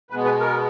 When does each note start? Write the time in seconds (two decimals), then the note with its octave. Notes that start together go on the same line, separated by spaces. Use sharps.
0.10 B2 G#3 B3 B4
0.25 B4
0.40 A#4